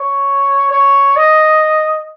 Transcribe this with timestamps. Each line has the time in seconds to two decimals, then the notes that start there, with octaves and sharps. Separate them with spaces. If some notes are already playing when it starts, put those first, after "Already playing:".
Already playing: C#5
0.71 C#5
1.17 D#5